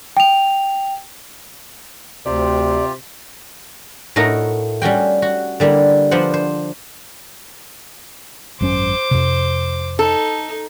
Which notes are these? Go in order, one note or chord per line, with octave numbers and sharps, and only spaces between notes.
G5 F7
D2 C3 F4 G4 D5
A2 A3 D#4 F#4 A#4 A#5
G3 C#4 F#4 G5
F#4
D3 G3 A#3 E4
F3 B3 D4 C5 F#5
C5
G#1 F#2 C#4 C5 D6
F2 C3
D#4 A4